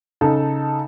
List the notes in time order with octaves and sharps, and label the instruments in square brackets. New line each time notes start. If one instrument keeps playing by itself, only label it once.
[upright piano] C#3 D#4 A4